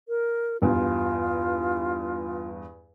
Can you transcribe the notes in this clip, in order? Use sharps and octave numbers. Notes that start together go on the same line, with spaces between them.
A#4
E2 G2 F4